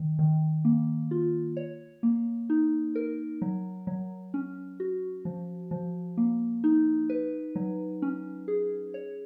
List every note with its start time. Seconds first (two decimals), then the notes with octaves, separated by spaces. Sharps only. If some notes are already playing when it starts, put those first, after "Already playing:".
Already playing: D#3
0.19 D#3
0.65 A#3
1.11 F4
1.57 C#5
2.03 A#3
2.50 D#4
2.95 A#4
3.42 F#3
3.87 F#3
4.34 C#4
4.80 F#4
5.25 F3
5.71 F3
6.17 A#3
6.64 D#4
7.10 B4
7.55 F#3
8.02 C#4
8.48 G#4
8.94 C#5